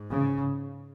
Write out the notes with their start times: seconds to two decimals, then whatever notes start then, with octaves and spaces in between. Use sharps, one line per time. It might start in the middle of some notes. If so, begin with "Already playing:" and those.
Already playing: G#2
0.11 C#3